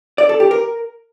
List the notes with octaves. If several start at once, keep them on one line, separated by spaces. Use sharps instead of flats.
D5
A4
G4
A#4